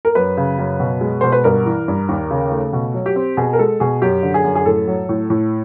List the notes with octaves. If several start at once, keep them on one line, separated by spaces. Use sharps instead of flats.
A#4
F#2 B4
C#3
F#2
B2
G#3
B2 C5
B4
G2 A#4
E3
G2
D#2
C#3
A3
B2
F#3
G4
C4
B2 G#4
A#4
G#3 A4
B2 G#4
F#2 G4
D3
G#4
F#2
G#4
A2 A4
F#3
A2
A2